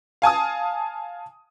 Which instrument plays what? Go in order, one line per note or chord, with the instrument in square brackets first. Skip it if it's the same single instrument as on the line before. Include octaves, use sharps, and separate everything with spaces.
[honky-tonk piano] F5 G#5 A5 D#6